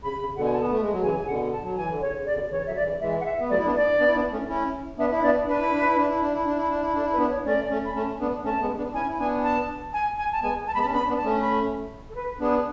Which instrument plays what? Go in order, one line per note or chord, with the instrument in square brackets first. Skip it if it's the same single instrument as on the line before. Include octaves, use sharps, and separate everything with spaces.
[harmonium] C#3 [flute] B5
[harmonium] C#3
[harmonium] B2 D3 [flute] F#5
[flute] G#5
A5
[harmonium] B3
A3
G#3
F#3
[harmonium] C#3 E3 [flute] G#5
[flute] G#5
[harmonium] C#3
[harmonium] B2 D3 [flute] F#5
[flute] A5
[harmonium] F#3
[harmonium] E3 [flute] G#5
[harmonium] D3
[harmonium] C#3 [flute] C#5
[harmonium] C#3
[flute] D5
[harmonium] C#3
B2 D3
[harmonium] C#3 E3 [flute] C#5
[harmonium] D3 F#3 [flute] E5
[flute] D5
[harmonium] C#3 E3
[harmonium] E3 G#3 [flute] E5
[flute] F#5
E5
[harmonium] B3
[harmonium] F#3 A3 [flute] D5
[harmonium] E4
B3 D4
[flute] D5
[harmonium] B3 D4
E4
B3 D4
A3 C#4
C#4 E4
[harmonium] B3 D4 [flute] E5
[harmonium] E4 [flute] E5
[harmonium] B3 D4 [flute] D5
[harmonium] D4 [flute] B4
[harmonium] E4
D4
E4
D4
E4
D4
E4
D4
E4
D4
E4
[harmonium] D4 [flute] A4
[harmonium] E4
[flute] B4
[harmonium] B3 D4
[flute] C#5
[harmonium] A3 C#4 [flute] D5
[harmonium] A3 C#4
[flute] B5
[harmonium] A3 C#4 [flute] A5
[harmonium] B3 D4
[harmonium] A3 C#4 [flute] A5
[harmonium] G#3 B3
B3 D4
[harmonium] C#4 E4 [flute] G#5
[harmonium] E4
[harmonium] B3 D4 [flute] G#5
[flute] A5
G#5
G#5
A5
[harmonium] G#3 B3 [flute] G#5
[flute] A5
[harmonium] G#3 B3 [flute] B5
[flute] A5
[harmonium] C#4
[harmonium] B3 D4 [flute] B5
[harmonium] B3 D4
[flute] A5
[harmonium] A3 C#4
[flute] B5
A4
B4
[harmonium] B3 D4 [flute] G#4